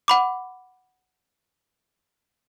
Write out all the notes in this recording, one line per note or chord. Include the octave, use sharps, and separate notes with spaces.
F#5 B5 D6